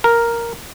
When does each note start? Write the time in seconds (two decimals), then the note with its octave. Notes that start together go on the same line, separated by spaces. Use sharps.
0.04 A#4